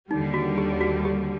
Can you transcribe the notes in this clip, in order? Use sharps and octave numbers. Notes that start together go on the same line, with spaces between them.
D#2 D3 G3 D#4
F#4
G4
F#4
G4